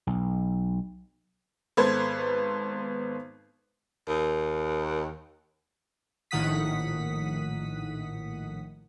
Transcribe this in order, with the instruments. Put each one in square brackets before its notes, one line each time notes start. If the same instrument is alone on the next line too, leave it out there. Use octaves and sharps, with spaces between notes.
[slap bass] B1
[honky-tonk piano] G#1 B3 A4 B4 C5 G#6
[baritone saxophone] D#2
[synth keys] A#1 A2 D#3 F#5 D#6 B6